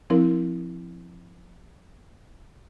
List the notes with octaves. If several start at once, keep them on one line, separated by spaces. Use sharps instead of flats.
F3 C4 E4 A#4